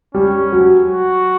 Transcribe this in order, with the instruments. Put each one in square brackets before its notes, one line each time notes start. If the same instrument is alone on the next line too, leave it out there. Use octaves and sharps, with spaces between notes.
[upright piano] G3 [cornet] C#4
[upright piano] F#3
[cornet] F#4